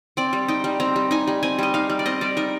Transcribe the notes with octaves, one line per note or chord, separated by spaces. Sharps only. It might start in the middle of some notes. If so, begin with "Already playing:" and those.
C4 D5
G3
D#4 G5
G3
C4 A#5
G3
D#4 G#5
G3
C4 G#5
G3 D#5
D#4 F5
G3
D5
C4 D#5
G3 D5
D#4 A#4